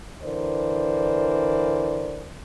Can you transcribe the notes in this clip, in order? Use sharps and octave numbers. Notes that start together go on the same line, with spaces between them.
D3 E3 A#4 C5 D5